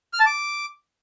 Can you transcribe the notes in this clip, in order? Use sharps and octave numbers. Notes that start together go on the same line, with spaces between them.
F6
A5
D6